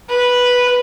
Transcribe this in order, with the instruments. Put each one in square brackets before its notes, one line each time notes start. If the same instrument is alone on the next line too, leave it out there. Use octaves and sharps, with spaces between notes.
[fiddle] B4